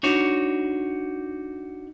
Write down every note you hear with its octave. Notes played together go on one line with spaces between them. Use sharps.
D4 D#4 F#4 C#5